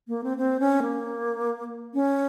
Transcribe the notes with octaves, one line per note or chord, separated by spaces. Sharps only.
A#3
C4
C4
C#4
A#3
C#4